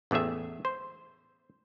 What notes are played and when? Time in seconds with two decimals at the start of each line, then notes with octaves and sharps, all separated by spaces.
0.11 A1 E2 A3 G#4 E5
0.65 C5